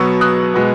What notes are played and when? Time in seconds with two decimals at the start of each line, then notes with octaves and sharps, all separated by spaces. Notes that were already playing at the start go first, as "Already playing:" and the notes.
Already playing: B2 F#3 B3 C#6 E6
0.21 D#6 F#6
0.54 B2 G#3 B3